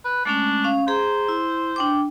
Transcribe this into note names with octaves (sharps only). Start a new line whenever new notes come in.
B4
G#3 A3 C#4 D4
C#4 F5
G#4 C5 A#5
E4
D4 G5 D6